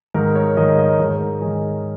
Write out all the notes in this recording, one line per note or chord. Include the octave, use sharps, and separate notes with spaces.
G#2 D#3 A#4
C#5
G#2 D#3 D#5
D#5
G#2 D#3 C#5
A#4
C#5
G#2 D#3 G#4